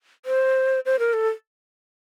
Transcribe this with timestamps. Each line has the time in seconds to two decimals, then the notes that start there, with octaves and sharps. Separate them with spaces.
0.26 C5
0.86 C5
0.99 A#4
1.13 A4